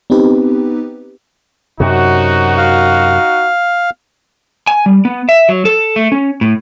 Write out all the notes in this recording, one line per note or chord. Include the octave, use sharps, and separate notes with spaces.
B3 C4 D#4 G4 B4
F#2 C3 D#4 F#4
F5
G#5
G3
B3
E5
F#3
A4
A3
C#4
A2